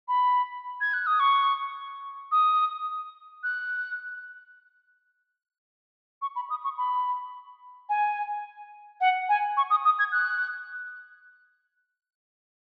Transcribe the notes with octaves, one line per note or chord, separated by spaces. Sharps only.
B5
G#6
F#6
D#6
C#6
D#6
F#6
C#6
B5
D#6
C#6
B5
G#5
F#5
G#5
C#6
D#6
D#6
G#6
F#6